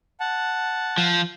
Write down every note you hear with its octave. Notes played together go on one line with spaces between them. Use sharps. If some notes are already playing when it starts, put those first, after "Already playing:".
F#5 A5
F3